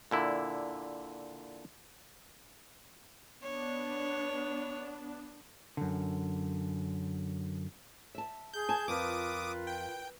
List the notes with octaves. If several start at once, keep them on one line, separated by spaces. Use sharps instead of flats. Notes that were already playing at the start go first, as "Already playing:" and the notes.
A#2 D3 E4
B3 D4 C#5
F#2 D3
E5 A5
G#4 G6
G#5 A5
F2 F4 A#4 B4 D6 D#6
G5